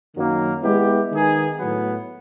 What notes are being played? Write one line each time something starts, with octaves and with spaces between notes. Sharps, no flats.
F#2 D#3 F#3 A#3
G#3 B3 E4 G4
D#3 G#3 B3 D#4 G#4
A2 F#3 B3